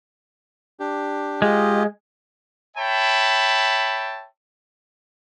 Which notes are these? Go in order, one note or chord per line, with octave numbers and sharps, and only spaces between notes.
D4 G4
G#3 F4 G4 D#5
C#5 E5 G5 A5 B5